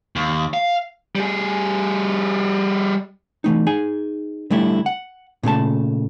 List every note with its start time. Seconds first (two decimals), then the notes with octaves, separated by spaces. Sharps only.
0.16 D#2
0.54 F5
1.16 G3 G#4
3.44 E3 A3 D#4
3.67 D#4 G#4 G#5
4.51 D3 G3 A3 E4 G4
4.86 F#5
5.43 A#2 C#3 A3 A5